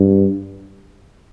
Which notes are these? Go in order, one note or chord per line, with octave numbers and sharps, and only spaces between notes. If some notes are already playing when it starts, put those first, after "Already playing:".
Already playing: G2